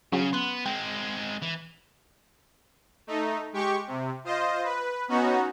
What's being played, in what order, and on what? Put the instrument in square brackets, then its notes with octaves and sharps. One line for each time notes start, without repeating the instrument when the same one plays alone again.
[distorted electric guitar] C#3 [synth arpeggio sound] F#3 C#4 G#4
[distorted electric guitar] B3 [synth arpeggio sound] C6 F#6
[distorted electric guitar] G#3 C4 [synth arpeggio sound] G5
[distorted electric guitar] E3
[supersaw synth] A3 D#4
G#3 G4 C#6
C3
F4 C5 D#5
B4
B3 C#4 D#4 F#4